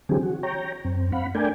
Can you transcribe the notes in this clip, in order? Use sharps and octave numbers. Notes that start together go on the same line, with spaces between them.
D3 E3 F#3 C4 G4 G#4
F#4
C#5 G5 A#5
F#2 C4
C4 F5 F#5 B5
A3 D4 A#4 D5 G5 G#5